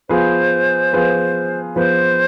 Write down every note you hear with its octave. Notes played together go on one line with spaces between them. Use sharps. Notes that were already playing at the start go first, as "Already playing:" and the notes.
F3 B3 F4 G#4 B4 C5
F3 B3 F4 G#4 B4
F3 B3 F4 G#4 B4 C5